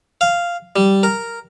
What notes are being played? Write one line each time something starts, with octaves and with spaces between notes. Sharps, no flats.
F5
G3
A#4